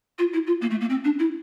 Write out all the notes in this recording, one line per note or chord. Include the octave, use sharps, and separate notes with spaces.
F4
E4
F4
A#3
A3
A#3
C4
D4
E4